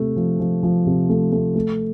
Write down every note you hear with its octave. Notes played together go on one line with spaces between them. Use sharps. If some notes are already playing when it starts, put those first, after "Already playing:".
Already playing: C3 A3
F3
F3
F3
C3
A3
A3
A3